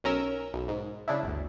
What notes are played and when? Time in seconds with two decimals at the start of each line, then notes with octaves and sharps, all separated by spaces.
0.04 B1 C#4 A#4 E6
0.54 B1
0.68 G#2
1.08 C#3 D4 E4
1.23 G1 D2